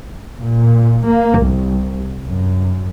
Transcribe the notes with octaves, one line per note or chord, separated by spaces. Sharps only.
A#2
A#3
C2
F#2